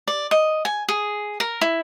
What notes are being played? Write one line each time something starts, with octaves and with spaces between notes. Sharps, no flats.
D5
D#5
G#5
G#4
A#4
E4